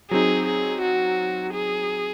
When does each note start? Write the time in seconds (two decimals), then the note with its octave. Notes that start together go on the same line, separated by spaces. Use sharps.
0.11 F#3 C4 D#4 G#4
0.46 G#4
0.82 F#4
1.54 G#4